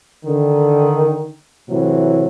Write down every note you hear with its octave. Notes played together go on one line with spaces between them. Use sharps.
D3 D#3
A2 C3 E3 F#3